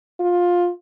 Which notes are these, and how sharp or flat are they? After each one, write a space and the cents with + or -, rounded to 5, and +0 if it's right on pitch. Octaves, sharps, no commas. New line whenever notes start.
F4 +15